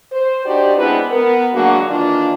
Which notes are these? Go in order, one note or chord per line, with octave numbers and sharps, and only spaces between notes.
C5
D4 D#4 F#4 G4 C5 D5
G#3 B3 C4 D4 E4 B4
B3 A#4
D3 F#3 G#3 A#3 D4 F#4
D#3 E3 A#3 D4 F4